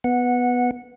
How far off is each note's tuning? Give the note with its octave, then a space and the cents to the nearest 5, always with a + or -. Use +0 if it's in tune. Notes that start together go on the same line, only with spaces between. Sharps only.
B3 +0 F#5 -15